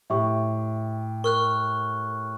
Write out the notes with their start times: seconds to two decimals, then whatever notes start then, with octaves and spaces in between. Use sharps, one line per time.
0.10 A2 G4 E5 C#6
1.24 A#4 C#6 F6 F#6